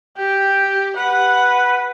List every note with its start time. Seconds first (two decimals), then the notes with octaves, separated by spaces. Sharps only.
0.17 G4 G5
0.97 B4 F#5